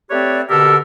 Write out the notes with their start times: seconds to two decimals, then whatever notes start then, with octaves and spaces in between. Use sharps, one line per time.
0.11 A3 C4 G4 B4 C#5 D5
0.50 B2 D3 G4 A4 A#4 E6